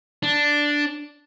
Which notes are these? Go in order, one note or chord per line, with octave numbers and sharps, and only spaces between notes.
D4